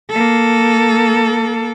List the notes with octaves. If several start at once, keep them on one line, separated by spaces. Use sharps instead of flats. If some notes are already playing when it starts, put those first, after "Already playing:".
A#3 A4